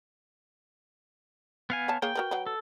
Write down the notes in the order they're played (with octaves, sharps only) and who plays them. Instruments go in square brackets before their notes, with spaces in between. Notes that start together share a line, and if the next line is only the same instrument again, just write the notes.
[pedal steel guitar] B3 F5 G#5
[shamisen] C#5 A5
[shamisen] A#3 G#4 C#5 [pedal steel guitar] G5
[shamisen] F#4 A#4 B4
F#3 B4
[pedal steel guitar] A4